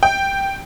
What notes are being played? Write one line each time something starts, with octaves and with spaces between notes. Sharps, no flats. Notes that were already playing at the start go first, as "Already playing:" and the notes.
G5